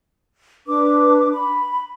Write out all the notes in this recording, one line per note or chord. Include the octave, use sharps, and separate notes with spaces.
D4 B4 D6
B5